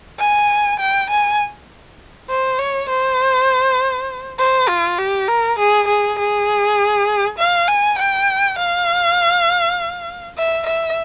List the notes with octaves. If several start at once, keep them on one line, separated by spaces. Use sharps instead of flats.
G#5
G5
G#5
C5
C#5
C5
C5
F4
G4
A#4
G#4
G#4
G#4
F5
G#5
G5
F5
E5
E5